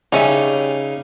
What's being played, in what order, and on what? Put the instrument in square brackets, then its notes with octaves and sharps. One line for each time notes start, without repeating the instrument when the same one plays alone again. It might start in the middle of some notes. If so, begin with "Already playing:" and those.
[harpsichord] C#3 D#4 [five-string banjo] G3 C#4 E5